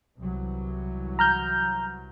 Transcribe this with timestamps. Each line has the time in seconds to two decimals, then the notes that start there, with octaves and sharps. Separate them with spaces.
0.20 C2 E3 F#3
1.19 A#5 F6 G6